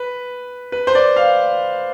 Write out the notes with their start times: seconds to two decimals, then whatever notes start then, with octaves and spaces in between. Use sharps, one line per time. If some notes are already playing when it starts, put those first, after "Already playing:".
Already playing: B4
0.72 B4
0.87 C5
0.95 D5
1.16 F5